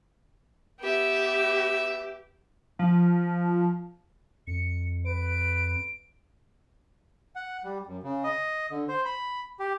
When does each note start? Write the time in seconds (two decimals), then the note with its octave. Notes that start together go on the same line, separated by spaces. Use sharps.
0.80 B3 G4 E5
2.79 F3
4.47 F2 C#7
5.05 B4 D7
7.36 F#5
7.64 G3
7.87 F#2
8.03 C#3
8.24 D#5
8.71 D3
8.89 C5
9.05 B5
9.59 G4